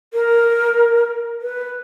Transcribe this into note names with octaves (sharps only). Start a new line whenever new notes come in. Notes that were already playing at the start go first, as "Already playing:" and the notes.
A#4
B4